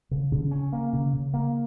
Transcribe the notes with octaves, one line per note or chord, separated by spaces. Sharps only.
C#3
C#3
C#4
A#3
C#3
C#3
A#3